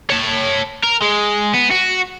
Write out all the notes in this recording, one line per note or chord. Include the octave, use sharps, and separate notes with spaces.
C#5 A5
A#4
G#3
B3
F#4